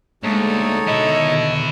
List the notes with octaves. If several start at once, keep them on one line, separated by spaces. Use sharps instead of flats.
D2 G#3 A#3 D#4 A4 C#5
B2 D3 D#3 B3 E4 D#5